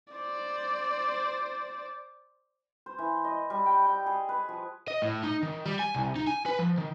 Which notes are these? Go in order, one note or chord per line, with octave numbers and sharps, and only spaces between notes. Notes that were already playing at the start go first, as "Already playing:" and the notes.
C5 D5
C5
E3
D#5
G3
G5
G5
G#4
B4
F3
D#5
A2
D#4
D#3
G3
G#5
C2
D#4
G#5
B4
F3
D#3